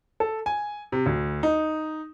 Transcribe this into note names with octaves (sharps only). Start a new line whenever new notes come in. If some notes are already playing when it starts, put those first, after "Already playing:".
A4
G#5
C3
D2
D#4